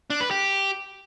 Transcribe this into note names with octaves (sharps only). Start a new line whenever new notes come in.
D4
B4
G4